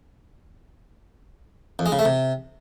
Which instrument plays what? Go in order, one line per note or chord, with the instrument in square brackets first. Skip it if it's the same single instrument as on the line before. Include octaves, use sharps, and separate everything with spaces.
[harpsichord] F2
G#3
C#3
A3
C3